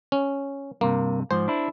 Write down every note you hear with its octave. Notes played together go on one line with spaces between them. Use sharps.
C#4
G2 C3 A#3
G#2 F3 C5
D4 E4